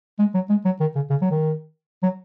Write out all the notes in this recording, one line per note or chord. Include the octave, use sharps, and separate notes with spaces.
G#3
F#3
G#3
F#3
D#3
C#3
C#3
F#3
D#3
F#3